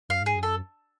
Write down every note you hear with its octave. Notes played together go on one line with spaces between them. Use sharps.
F#2 F5
G#2 G#4
F#2
A4